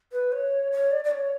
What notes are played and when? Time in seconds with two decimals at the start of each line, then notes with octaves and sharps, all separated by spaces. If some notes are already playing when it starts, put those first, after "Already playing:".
0.12 B4
0.32 C#5
0.72 C#5
0.92 D5
1.05 D5
1.11 C#5